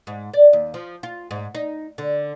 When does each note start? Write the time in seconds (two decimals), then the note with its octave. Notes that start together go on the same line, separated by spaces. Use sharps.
0.07 G#2
0.34 D5
0.53 D#2
0.74 F3
1.03 F4
1.31 G#2
1.55 D#4
1.98 D3